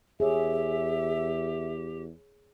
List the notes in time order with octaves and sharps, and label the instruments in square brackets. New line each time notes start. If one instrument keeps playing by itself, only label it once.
[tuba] E2 [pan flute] G4 [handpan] G#4 C#5 [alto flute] E5